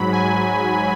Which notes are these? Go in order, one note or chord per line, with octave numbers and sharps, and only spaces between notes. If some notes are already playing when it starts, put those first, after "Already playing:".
Already playing: G#2 F#3 B5
G#5